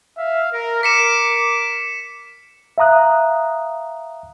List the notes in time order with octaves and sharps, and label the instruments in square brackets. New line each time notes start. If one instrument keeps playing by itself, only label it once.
[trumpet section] E5 F5
A#4
[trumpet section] A#4 D6 [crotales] B6 C#7 E7
[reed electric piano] E5 F5 A#5 D#6 F#6